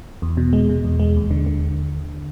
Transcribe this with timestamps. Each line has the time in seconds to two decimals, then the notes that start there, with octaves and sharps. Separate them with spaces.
0.22 E2
0.37 B2
0.53 G#3
0.69 B2
0.85 E2
1.00 G#3
1.16 D#2
1.31 D3
1.46 D3